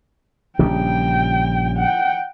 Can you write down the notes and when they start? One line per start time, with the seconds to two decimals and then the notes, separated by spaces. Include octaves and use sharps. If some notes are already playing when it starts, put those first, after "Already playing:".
0.59 A#1 C#3 G3 G5
1.76 F#5 G5